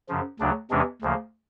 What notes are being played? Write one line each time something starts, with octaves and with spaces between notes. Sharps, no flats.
F#2 C#3 F3
D2 C#3 F#3 D4
E2 C3 E3 G#3 C#4 D4
D2 C#3 F3 A#3